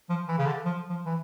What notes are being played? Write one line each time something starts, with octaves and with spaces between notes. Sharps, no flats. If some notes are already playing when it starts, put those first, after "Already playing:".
F3
E3
C#3
D3
F3
F3
E3